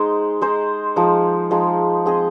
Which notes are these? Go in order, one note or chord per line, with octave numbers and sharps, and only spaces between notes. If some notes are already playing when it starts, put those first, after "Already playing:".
Already playing: G#3 D#4 C5
G#3 D#4 C5
F3 G#3 D#4
F3 G#3 D#4
C4 G#4 D#5